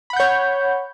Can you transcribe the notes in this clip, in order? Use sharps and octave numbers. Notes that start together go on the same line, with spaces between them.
C#5 F#5 B5 G6